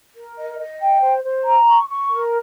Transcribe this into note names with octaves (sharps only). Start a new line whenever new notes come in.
A#4
D#5
D#5
G5
C5
C5
A#5
C#6
C#6
A#4